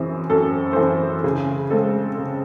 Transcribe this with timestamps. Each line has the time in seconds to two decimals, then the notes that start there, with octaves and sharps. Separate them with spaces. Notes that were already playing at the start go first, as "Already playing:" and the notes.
Already playing: F#2 E3 C4 G#4
0.30 F#2 A4
0.73 C5
0.76 E3 C4 A4
1.24 C#3 G#4
1.70 G#3 C4 A4
2.18 C#3